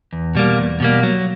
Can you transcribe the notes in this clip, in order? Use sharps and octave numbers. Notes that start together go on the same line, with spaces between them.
E2
B2 G3 A#3
E2
B2 G3 A#3
F#3